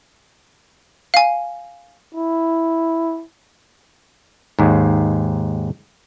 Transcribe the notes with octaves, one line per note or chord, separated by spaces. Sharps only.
F5 G#5
E4
D#2 G#2